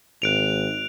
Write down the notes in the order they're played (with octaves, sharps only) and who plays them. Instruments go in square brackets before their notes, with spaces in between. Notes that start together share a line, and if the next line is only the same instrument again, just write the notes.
[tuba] G#1 [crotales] F#6 D7 F7